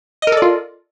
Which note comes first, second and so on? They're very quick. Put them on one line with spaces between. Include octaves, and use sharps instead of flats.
D#5 A#4 A4 D5 F4